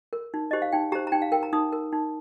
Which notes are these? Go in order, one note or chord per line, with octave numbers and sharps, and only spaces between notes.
A#4
D#4
G4 C5 D#5
F5
D#4 G5
G4 C5 A#5
A#5
D#4 G5
F5
A#4 G5
A#5
D#4 D#6
A#4
D#4